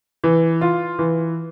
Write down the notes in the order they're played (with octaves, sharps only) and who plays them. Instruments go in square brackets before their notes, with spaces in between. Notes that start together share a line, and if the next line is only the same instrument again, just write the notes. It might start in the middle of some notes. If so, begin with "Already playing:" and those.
[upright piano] E3
F4
E3